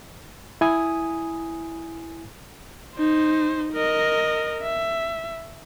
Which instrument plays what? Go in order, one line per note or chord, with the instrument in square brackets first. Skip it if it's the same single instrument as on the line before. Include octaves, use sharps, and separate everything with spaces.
[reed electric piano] E4 G#5 D#6
[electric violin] D#4 C5
A#4 D#5
E5